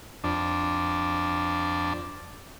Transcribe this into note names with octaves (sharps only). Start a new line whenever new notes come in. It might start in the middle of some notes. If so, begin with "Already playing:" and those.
F2 D4